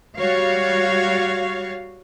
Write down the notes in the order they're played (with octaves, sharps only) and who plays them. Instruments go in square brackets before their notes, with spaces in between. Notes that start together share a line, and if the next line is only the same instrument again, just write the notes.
[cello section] G3 F#4 C#5 F5